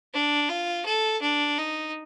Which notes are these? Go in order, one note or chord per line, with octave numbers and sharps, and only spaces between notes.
D4
F4
A4
D4
D#4